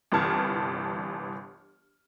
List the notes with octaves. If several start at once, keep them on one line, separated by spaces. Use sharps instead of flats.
G1 C2 E3 A5 F6 G#6